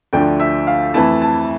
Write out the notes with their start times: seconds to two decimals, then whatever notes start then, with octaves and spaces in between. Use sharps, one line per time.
0.13 D2 D3 F3 A3 D4 G5
0.40 E5
0.67 F5
0.94 F2 E3 A3 E4 A5
1.22 A5